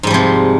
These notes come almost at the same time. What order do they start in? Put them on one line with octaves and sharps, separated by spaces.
G#2 G3 F3 C3